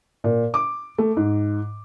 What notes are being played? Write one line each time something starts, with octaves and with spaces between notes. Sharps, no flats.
A#2
D6
A3
G#2